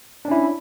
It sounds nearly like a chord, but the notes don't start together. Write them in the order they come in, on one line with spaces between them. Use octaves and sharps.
D4 C#4 E4